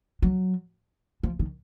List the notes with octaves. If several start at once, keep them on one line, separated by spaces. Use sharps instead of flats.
F#3
F3
D#3